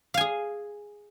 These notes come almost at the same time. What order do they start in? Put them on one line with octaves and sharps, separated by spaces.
F5 G#5 G#4